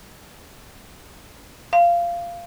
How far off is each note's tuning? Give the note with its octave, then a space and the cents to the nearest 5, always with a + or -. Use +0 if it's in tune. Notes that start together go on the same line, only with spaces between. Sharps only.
F5 -15